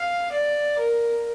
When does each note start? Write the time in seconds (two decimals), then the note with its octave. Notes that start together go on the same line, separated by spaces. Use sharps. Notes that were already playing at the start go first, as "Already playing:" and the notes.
Already playing: F5
0.32 D5
0.79 A#4